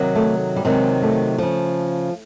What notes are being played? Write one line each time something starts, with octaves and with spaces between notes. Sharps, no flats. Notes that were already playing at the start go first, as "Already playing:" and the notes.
Already playing: C3 D#3 F#3
A3
G3
C3 D#3 F#3 G#3
A3
C#3 F3